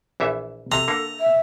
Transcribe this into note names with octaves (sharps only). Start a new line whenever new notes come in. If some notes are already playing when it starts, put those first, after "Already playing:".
A#1 E3 E5
C3 A4 A#5
D3 A#3
E5